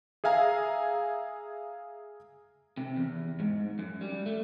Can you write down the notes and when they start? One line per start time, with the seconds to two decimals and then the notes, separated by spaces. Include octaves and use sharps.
0.24 G#4 E5 F5 G#5 A#5
2.77 C3
2.96 E2
3.40 G#2
3.79 F#2
4.01 G3
4.26 A3